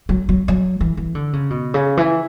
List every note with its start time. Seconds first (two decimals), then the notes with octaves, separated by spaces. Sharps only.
0.09 F#3
0.29 F#3
0.48 F#3
0.81 E3
0.97 E3
1.15 D3
1.33 C#3
1.50 B2
1.74 C#3
1.97 E3